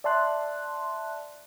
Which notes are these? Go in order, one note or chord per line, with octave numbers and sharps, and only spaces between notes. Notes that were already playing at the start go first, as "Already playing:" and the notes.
D5 E5 A5 C6 F#6